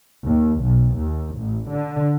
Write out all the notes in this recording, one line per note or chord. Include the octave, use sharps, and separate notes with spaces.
D#2
B1
D#2
A1
D3